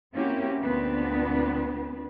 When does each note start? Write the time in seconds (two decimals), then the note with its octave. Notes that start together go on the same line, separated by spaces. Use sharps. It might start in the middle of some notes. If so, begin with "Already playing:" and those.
0.14 A#3 C4 C#4 E4 F#4 G4
0.60 D2 A#2 B3 C4 D4 B4